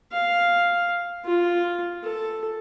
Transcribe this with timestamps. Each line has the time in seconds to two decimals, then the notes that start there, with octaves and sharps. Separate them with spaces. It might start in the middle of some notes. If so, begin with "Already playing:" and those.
0.12 F5
1.25 F4
2.03 A4